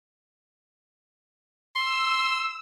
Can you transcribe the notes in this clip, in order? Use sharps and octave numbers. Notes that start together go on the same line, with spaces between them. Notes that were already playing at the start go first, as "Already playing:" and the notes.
C6 E6